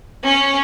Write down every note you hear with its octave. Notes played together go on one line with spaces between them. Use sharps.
C#4